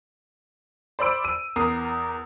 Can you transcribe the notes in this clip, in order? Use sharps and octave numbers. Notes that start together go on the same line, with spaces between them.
C5 D5 B5 E6 D7
E6 D#7
E2 A#4 D#6 C7